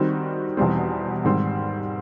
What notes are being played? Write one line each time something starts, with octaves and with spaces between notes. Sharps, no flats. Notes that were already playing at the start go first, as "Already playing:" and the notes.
Already playing: D#3 G3 C4 D#4 F#4
E2 B2 G3 C4
G#2 D#3 G3 C4